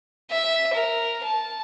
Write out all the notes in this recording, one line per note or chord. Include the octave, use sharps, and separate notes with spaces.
E5
A#4
A5